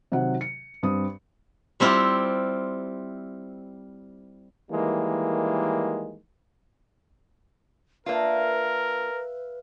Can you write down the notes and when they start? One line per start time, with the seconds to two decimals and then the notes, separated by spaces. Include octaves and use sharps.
0.12 C3 D#3 F#3 F#5
0.41 C#7
0.83 G2 C4 D#6
1.80 G3 C4 E4 F4 G4
4.71 D#3 E3 G3 G#3 A#3
8.06 A#3 D4 F4 A#4 B4 E5 F5